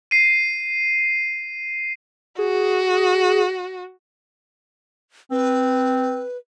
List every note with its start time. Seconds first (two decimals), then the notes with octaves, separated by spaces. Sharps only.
0.11 C7 D#7
2.39 F#4 G#4
5.31 C4 B4